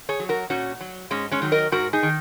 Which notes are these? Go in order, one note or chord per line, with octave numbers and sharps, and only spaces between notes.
G#4 C#5
F#3
F#4 A#4
A#2 C#4 F#4
F#3
G#2 G#3 C#4
G#3 C#4
D#3 F#3
A#4 D#5
G#2 F#4 A#4
D#4 G#4
D#3